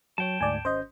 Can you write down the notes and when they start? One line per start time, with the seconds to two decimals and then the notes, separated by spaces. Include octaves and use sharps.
0.18 F#3 C#5 G5 A5
0.41 D2 G#2 D5 G#5
0.65 G#1 C#4 C5 D#5 G6